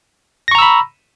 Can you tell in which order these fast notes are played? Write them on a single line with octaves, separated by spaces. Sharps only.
A#6 C#6 A#5 E6 B5